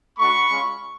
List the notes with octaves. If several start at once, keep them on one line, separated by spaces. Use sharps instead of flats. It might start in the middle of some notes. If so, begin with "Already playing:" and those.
A3 D4 F#4 B5 C#6
G#3 C#4 F4